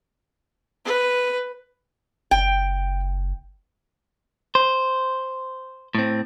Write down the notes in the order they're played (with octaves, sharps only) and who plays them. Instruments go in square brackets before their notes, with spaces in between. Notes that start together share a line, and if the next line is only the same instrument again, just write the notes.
[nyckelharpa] B4
[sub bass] F#1 [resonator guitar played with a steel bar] G5
[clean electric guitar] C5
A2 C4